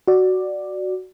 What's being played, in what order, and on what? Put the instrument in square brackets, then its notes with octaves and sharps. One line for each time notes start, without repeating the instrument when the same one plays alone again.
[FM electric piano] F#4 D5